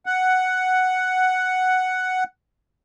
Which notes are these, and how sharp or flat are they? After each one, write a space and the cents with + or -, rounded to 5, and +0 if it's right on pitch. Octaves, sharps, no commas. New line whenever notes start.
F#5 +5